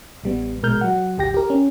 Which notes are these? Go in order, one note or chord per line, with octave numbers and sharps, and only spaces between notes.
A1 G3 B3
A#1 B2 G#3 A#4 F6 G6
F#3 F#5
A1 D2 G4 G5 A#6
G4 A#4
C#4